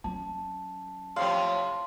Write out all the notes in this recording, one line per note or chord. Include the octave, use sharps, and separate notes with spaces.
F#3 C#4 A5
A2 C3 F3 F5 C6